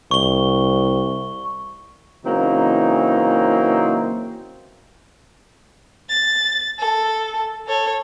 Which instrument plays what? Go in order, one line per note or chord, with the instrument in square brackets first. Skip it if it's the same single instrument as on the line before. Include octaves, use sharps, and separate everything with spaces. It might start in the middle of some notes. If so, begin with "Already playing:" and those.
[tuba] C2 [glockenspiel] C#6 G7
[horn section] C#3 E3 F#3 A#3 C4 D#4
[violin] A6
A4
A4 C#5